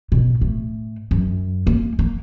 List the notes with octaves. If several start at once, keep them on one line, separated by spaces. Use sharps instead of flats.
B2
A2
F#2
A#3
A#3